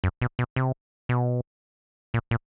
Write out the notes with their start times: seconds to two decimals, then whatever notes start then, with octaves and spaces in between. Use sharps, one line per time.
0.04 F#2
0.22 B2
0.39 B2
0.56 C3
1.09 B2
2.14 A#2
2.31 A#2